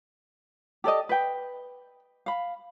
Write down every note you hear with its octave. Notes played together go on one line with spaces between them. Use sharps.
G4 A4 D5 D#5
B4 G5
F5 B5